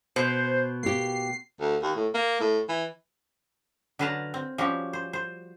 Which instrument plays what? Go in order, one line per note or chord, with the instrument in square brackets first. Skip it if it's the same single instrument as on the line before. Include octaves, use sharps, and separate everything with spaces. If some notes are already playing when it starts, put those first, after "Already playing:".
[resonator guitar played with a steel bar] B2 [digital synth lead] C5
[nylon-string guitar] A#3 G4 [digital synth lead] C7
[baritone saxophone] D2
D#2
A2
A#3
A2
E3
[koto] D3 F#3 B4 F5 A5 A#5
C4
F3 G3 C#4 F#4 G4
C5
C5